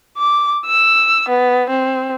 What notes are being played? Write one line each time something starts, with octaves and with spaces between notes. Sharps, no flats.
D6
E6
B3
C4